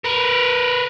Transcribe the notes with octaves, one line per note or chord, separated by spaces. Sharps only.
A#4 B4